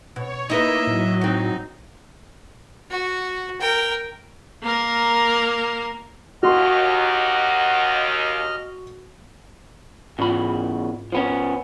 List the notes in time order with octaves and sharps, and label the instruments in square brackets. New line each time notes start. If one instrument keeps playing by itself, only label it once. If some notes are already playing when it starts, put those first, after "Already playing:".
[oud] B2 [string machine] C#5
[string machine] A#3 [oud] D#4 E4 B4 [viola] D#5 E5
[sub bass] A2 [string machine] F#3
[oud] C4 F#4 [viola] D#4
[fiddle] F#4
A#4 G5
[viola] A#3 A#4
[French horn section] D#2 [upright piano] F#4 C6 [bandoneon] D#5 F6 [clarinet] F#5
[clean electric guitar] E2 C#3 B5 [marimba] G#2 F4
[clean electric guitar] F3 B3 C#4